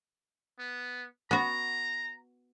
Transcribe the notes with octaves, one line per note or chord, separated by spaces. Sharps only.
B3
B3 F#4 A#5